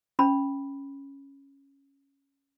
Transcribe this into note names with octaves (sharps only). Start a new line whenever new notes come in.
C#4 B5